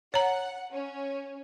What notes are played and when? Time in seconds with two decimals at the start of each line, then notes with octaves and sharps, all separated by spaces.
0.14 C#5 F#5 A#5
0.72 C#4